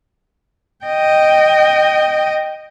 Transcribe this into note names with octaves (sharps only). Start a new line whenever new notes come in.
D#5 G5